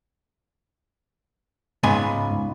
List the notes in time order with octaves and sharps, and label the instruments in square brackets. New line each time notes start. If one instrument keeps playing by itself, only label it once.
[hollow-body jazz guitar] C#2 B3 G#5 [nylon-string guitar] G#2